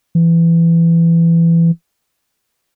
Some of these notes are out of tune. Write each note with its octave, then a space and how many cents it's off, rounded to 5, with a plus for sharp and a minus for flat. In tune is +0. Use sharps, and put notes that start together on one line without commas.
E3 +20